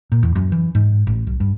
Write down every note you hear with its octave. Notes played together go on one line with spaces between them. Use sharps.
A#2
E2
F#2
E3
G#2
A1
B1
G2